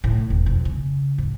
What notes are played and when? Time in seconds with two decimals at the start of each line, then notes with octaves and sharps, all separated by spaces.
0.04 A2
0.30 E1
0.46 F2
0.65 C#3
1.18 G#2